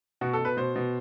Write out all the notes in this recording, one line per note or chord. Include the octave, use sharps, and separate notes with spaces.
B2 F#4
A4
B2
B4
B2 C5
B2